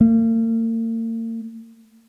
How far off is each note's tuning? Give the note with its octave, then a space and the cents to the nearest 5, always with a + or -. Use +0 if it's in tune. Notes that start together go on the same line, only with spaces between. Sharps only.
A#3 -45